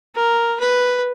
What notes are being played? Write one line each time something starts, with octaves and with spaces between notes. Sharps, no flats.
A#4
B4